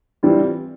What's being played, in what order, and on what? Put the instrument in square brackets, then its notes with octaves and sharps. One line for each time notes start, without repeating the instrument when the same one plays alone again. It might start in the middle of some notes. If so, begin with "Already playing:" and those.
[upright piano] E3 G3 C4 F4